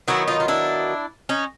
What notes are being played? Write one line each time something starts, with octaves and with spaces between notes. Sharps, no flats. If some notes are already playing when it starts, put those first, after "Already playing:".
D#3 F#3 B3 E4 F#4
D#4 F4
F4
D4 E4
C#4 D#4